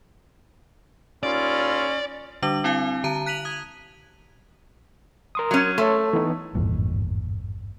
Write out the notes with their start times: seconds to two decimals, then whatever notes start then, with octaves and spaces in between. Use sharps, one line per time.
1.23 D#2 C#4 E4 F4 D5
2.43 D3 G3 D4 D6 F#7
2.64 C4 E4 F5 G#5
3.04 D3 A5 A#5 D#7
3.26 F#6 B6 D#7 F7 F#7
3.45 D#6 G#6
5.35 A#4 C6 D#6
5.51 F#3 C#4
5.78 A3 C#5 A5 C6
6.13 E3 B3 D#4
6.55 G#1 E2 G2 A#2